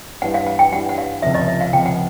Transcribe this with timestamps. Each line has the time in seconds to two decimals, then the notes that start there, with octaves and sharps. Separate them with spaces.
0.22 G2 E3 G3 F#5
0.34 F5
0.47 F#5
0.59 G5
0.72 G2 E3 G3 F#5
0.89 F#5
0.98 F5
1.22 C#2 C3 F3 E5
1.35 D#5
1.48 E5
1.61 F5
1.73 C#2 C3 F3 G5
1.86 F#5